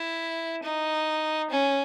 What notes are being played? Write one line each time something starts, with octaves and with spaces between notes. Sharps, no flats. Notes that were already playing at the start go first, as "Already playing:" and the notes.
Already playing: E4
D#4
C#4